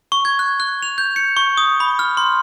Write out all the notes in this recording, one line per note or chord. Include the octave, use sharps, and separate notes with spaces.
C#6
G#6
F#6
F#6
F7
G6
C#7
C#6
D#6
B5
F6
C6